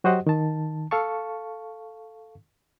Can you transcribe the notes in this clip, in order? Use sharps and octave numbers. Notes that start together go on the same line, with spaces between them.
F#3 F#4 G4 C5 D#5 F#5
D#3 A5
A4 F5 A5 C#6